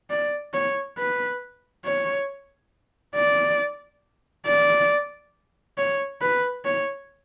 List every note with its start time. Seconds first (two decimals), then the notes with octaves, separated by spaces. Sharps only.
0.10 D5
0.53 C#5
0.98 B4
1.85 C#5
3.15 D5
4.46 D5
5.78 C#5
6.21 B4
6.65 C#5